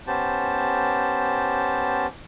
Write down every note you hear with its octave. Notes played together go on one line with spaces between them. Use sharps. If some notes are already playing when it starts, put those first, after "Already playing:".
B3 C#4 G4 C5 A5